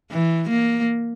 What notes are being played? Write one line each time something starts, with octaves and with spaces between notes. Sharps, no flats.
E3
A#3